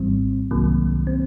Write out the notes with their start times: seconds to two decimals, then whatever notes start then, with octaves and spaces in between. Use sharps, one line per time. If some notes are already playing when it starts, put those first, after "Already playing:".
Already playing: G#1 G#2 E3 G3 C4
0.51 C2 C3 D#3 F#3 A#3
1.07 C4